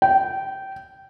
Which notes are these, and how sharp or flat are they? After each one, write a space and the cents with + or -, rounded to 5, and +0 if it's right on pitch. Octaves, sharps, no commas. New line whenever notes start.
G5 -15